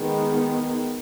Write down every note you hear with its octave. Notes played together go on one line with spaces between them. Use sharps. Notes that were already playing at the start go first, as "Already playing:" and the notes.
Already playing: D#3 G#3 B3